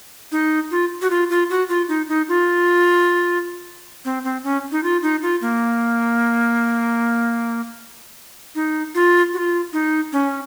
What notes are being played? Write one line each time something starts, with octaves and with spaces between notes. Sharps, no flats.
D#4
F4
F#4
F4
F4
F#4
F4
D#4
D#4
F4
C4
C4
C#4
D#4
F4
D#4
F4
A#3
D#4
F4
F#4
F4
D#4
C#4